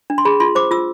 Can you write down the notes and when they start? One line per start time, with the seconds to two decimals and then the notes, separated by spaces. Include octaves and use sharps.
0.10 D4
0.18 C6
0.25 G#4 B5
0.40 F4 C6
0.55 C5 D6
0.71 F4 E6